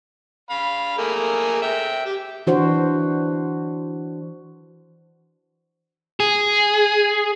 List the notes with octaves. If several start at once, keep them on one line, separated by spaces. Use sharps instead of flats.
F5 B5
A3 A#3 G#4
E5 G5
G4
E3 D4 F#4 C5
G#4